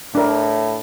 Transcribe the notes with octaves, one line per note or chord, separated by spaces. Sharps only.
A2 D4 A#4